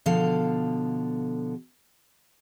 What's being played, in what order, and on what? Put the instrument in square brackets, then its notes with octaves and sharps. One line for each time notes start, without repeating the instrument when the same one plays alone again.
[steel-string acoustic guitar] B2 D3 F3 A4 F5